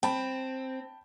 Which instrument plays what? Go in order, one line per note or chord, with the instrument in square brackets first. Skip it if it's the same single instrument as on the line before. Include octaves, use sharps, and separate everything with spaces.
[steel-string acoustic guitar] C4 [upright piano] G5 A5 B5